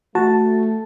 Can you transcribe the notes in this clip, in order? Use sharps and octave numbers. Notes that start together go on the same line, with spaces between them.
A3 F#4 A5